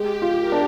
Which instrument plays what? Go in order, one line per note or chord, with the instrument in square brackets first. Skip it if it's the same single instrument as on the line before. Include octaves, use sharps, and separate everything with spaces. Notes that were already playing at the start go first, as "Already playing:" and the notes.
Already playing: [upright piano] G#3 [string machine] G4
[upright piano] F4
[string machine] A#4
[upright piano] D4